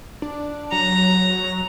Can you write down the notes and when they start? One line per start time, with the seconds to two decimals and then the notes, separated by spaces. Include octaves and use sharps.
0.22 D4
0.72 F#3 A#5